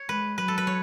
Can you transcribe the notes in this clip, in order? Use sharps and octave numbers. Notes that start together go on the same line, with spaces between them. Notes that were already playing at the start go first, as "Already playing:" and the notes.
Already playing: C#5
G#3 B4
F#3 B4
A4
B4
C#5